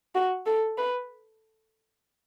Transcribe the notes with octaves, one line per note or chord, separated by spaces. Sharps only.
F#4
A4
B4